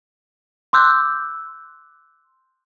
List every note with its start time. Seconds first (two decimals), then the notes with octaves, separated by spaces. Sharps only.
0.73 C6 D6 E6 F#6 G6